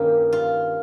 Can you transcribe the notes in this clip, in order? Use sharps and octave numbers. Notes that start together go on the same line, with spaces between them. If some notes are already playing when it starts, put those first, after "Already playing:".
Already playing: G2 D#3 A#3 C#4 F4 G4 A#4
F4